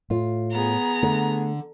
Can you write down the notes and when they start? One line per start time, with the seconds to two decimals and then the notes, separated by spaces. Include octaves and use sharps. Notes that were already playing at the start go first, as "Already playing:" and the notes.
0.10 A2 F4
0.52 B3 G#4 A#5
1.03 D3 A3